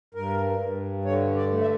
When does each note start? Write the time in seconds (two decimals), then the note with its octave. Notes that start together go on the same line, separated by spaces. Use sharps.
0.14 G2 A#4
0.59 G2
1.05 D3 C#5
1.36 D5
1.50 A3
1.62 E5